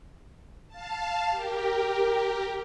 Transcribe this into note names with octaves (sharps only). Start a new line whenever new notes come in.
F5 A5
G4 A#4